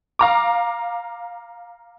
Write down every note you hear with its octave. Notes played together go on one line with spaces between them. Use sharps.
F5 A#5 D6